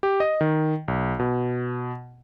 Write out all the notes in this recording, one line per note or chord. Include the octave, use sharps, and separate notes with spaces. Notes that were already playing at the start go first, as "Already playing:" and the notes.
G4
D#5
D#3
B1
B2